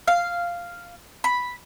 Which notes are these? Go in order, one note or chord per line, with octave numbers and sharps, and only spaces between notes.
F5
B5